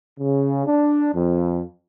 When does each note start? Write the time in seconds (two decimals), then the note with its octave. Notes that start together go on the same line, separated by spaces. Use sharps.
0.18 C#3
0.65 D4
1.13 F2